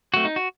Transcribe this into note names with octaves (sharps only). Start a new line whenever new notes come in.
F#3 A3 C4 F#4
D#4
F#4